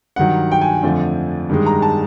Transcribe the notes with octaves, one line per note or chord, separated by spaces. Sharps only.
G2 D#3 F#3 F#5
G5
G#5
F2 D3 F3 A3
G2 D#3 G#3
A#5
A5